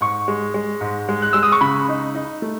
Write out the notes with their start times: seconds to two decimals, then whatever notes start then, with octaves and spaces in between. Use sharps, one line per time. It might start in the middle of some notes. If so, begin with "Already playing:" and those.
0.01 G#2 C#6
0.28 G#3
0.54 G#3
0.81 G#2
1.09 G#3
1.22 F#6
1.33 G#3 E6
1.43 D#6
1.52 C#6
1.61 C#3 B5
1.88 D#4
2.15 D#4
2.42 A3